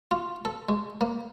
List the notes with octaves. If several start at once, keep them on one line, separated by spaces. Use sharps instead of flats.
F4
A4
G#3
A#3